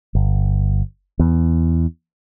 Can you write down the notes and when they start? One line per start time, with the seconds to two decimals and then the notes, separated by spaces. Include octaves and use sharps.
0.15 G1
1.19 E2